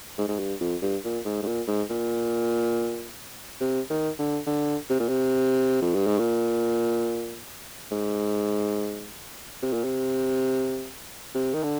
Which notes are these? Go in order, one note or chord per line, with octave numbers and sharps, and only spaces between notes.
G#2
G#2
G2
F2
G2
A#2
G#2
G#2
A#2
G#2
A#2
C3
D#3
D3
D3
C3
A#2
C3
F2
G2
G#2
A#2
G#2
C3
A#2
C3
C3
D#3
D3